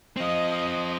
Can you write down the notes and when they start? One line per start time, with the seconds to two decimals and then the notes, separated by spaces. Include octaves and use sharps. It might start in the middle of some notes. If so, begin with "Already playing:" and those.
0.17 F3 C4 D#5